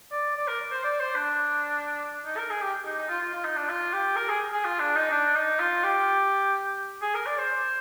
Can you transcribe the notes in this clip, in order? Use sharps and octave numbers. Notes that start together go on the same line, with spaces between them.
D5
D5
A#4
C5
D5
C5
D4
D#4
A#4
G#4
G4
D#4
D#4
F4
F4
F4
D#4
D4
F4
G4
A#4
G#4
G#4
F4
D4
D#4
D4
D#4
F4
G4
G#4
A#4
D5
C5